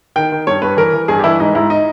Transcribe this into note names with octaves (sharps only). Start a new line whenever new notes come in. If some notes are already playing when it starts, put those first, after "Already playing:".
D#3 G5
D#3
G2 C#5
G2 B4
E3 A#4
E3
G2 G#4
G4
E3 E4
G#2 D#4
G#2 E4
D#4